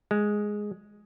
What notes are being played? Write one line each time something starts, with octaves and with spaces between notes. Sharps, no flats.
G#3